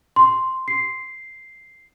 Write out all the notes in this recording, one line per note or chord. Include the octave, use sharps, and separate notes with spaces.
C6
C7